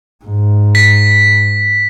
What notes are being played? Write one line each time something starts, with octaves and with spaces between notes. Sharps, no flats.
G#2
B6